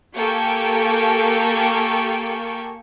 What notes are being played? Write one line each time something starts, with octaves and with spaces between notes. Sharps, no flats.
A#3 G4 A4 G5 G#5 C#6